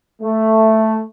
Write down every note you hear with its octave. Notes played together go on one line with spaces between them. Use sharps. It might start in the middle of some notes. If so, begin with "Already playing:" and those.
A3